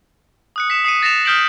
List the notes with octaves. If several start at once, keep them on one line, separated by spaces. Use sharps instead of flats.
D#6 F#6 C#7
B6 E7
D#6 C7 C#7 D#7
A6 A#6 C7 E7 F7
D#6 F6 G6 B6 D7 F#7